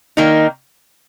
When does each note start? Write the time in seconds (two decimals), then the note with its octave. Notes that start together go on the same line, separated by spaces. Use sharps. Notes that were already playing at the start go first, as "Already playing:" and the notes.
0.17 D#3 A#3 D#4